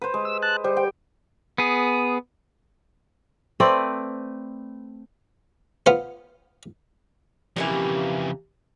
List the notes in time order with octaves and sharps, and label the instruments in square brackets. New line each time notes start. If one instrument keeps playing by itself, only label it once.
[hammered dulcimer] B4 C5
G#3
[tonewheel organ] E6
A5 F#6
[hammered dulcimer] G3 [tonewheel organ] C5
[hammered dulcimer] G5
[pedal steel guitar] B3 G#4
[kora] A3 C4 B4 D5
[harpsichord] B3 F4 C5
[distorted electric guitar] F2 C#3 [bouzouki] E3 A#3 G4